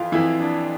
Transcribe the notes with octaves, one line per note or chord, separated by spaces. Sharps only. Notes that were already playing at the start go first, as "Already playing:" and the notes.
Already playing: F2 E3 F4
F2 E3 E4
D4